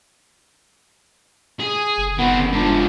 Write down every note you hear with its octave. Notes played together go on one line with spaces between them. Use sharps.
G#4
F#1
D#3 B3 C4
G#2 F3 D4